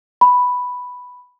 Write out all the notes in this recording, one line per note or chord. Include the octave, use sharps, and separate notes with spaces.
B5